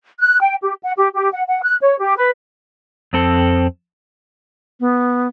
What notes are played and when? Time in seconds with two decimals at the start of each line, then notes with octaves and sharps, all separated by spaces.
0.19 F#6
0.40 G5
0.62 G4
0.83 F#5
0.96 G4
1.14 G4
1.33 F#5
1.48 F#5
1.62 F#6
1.81 C#5
2.00 G4
2.16 B4
3.13 F2 C4 A4
4.80 B3